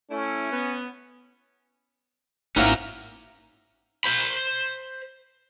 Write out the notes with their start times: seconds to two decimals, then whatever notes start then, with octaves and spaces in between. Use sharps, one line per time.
0.10 A3 C#4 E4
0.52 B3
2.56 G#1 A#3 C4 C#4 D#4 E4 F#4 A#4
4.04 C5 B5